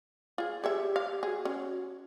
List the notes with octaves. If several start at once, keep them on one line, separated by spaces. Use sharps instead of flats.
F4 G#4
G4 G#4 C#5 E5
F5
F#4 G#4
C#4